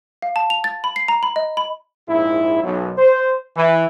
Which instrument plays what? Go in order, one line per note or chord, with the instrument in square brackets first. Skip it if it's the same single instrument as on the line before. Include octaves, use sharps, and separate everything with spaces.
[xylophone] F5
A5
F7
A6
B5
C7
A#5
B5
D#5
B5
[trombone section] A#1 G#2 E4
B1 F#2
C5
E3